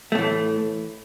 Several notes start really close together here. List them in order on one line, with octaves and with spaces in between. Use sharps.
A3 A2 E3